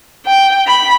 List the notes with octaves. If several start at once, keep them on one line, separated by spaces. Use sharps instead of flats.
G5
B5